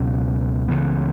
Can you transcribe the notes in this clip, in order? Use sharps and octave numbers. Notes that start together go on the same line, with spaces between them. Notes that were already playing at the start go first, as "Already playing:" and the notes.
Already playing: C#2 B2 F#3 C#4
C#2 C#3 E3 B3